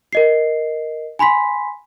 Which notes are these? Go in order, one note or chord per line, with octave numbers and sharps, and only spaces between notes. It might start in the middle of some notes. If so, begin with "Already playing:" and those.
A#4 D#5 C7
G#5 B5 C6 B6